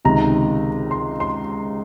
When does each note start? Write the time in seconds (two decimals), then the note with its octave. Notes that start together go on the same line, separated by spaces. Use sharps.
0.05 C#2 C3 D#3 A#5
0.91 C6
1.20 C6